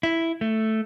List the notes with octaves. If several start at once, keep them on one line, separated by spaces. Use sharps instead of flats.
E4
A3